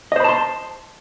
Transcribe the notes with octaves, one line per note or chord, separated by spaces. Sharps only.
C5 D#5 A5 B5 C6